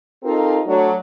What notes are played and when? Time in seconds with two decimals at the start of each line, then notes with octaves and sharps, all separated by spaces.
0.23 C4 D#4 F4 G4 A4 A#4
0.66 F#3 A3 D4